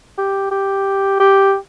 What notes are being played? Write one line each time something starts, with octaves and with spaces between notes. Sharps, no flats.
G4
G4
G4